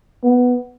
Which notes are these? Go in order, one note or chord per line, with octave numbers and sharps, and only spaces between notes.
B3